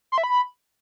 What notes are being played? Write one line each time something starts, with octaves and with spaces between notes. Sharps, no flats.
C6
E5
B5